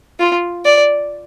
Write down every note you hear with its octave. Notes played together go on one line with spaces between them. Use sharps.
F4
D5